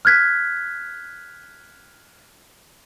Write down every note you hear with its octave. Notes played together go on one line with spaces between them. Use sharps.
F6 F#6 G#6 B6